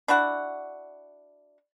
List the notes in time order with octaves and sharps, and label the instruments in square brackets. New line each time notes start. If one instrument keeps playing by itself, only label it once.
[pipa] D4 E4 F#4 F#5